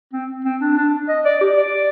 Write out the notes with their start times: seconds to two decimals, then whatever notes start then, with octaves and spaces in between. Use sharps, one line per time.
0.13 C4
0.45 C4
0.61 D4
0.77 D4
1.09 D#5
1.25 D5
1.41 G4
1.57 D5